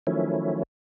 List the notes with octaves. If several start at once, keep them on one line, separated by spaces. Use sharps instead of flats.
D#3 F3 F#3 A3 C#4 E4